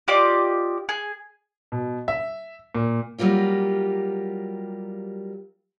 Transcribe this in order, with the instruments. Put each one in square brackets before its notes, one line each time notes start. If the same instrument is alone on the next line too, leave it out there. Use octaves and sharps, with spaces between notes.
[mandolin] F4 G4 D5 D#5
G#4
[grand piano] B2
E5
A#2
[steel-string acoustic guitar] F#3 G3 A#3 F4 G4